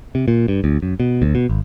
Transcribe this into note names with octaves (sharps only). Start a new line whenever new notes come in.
C3
A#2
G2
D2
F#2
B2
D2
B2
G#1